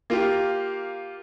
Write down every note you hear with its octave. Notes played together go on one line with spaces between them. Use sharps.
A#3 F4 G4